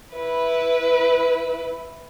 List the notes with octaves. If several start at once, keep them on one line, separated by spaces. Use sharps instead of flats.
E4 B4